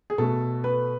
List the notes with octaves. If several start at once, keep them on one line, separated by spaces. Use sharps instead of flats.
G#4
B2 A3 A4
B4